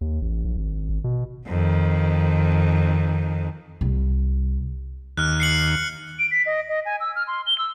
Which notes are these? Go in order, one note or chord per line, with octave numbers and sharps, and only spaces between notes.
D#2
A1
A#1
G#1
G#1
B2
F2 D#3
C2
D#2 F6 F#6
C7 C#7 F#7
D7
B6
D#5
D#5
G#5
E6
F6
C6
G7
E6